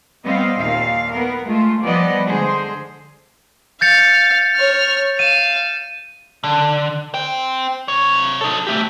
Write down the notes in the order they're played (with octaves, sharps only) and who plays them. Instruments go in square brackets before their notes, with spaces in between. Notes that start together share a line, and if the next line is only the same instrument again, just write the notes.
[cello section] G3 B3 C4 D#5 F5
D#2 A#2 F5
B3 A#4
G#3 A3 F4
F3 G3 B3 D5 D#5
D3 G#3 G#4 C5
[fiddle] F5 [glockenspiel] G6 A6 C#7
[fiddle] C#5 F6
[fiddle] F5 [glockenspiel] D#7 E7
[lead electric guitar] D3
C5 G5
C3 C#5
D#4 A4
A3 G4